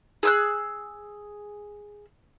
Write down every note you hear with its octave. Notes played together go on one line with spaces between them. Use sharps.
G#4 E6 F#6